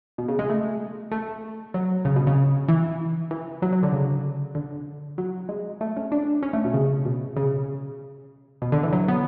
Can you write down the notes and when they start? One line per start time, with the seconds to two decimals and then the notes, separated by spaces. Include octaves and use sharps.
0.18 B2
0.28 C#3
0.39 G#3
0.50 A3
1.12 A3
1.74 F#3
2.05 C#3
2.16 B2
2.27 C#3
2.68 E3
3.31 E3
3.62 F#3
3.72 F#3
3.83 D3
3.93 C#3
4.55 D3
5.18 F#3
5.49 G#3
5.81 A3
5.97 C#4
6.12 D4
6.43 C#4
6.53 A3
6.64 B2
6.74 C#3
7.05 B2
7.37 C#3
8.62 B2
8.72 D3
8.83 E3
8.93 F#3
9.08 B3